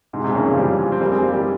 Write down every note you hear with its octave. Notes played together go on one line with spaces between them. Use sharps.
G#2 C3
G#2 C3
A#2 C#3
C#3 F3
E3 G3
F3 G#3
C4
G3 A#3
G#3 C4
G3 A#3
E3 G3